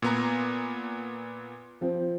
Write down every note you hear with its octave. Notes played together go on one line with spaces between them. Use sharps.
A#2 B3 A#5
F3 C4